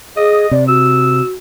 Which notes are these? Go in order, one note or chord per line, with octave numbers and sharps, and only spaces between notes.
G#4 D#5
C3 D5
F#4 E6